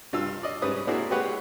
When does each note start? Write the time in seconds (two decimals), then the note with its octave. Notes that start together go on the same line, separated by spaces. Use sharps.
0.13 G2 F4 E6
0.43 D5 D#5
0.62 G#2 G3 C#4 B4 D#6
0.87 A#3 C4 D4 E4 F#4 G#4
1.11 G#3 G4 B4 C#5 F#5